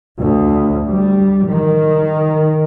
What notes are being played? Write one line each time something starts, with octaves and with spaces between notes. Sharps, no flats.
D2
G3
D#3